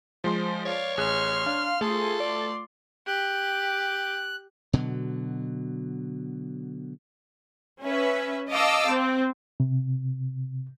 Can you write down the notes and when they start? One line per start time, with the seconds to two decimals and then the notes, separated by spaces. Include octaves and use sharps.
0.24 F3 G#3 C5 C6
0.65 C#5 D5 F5
0.97 A1 G#4 C6 F6 F#6
1.46 D4 F5
1.81 A3 F4 G#4 A4 C6
2.20 D5
3.07 G4 F#6
4.73 B2 D3 F#3
7.83 C#4 B4 E5
8.53 D#5 F5 A5 D6 E6
8.90 C4
9.60 C3